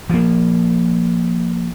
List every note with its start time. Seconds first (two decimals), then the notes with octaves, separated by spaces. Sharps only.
0.10 F3 A#3